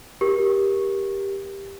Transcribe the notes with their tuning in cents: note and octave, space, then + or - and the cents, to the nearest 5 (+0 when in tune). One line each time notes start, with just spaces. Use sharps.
G4 +5 A#4 +20